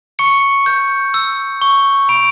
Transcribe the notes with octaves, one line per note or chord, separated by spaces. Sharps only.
C#6 C#7
G6
E6
C#6
B5 D7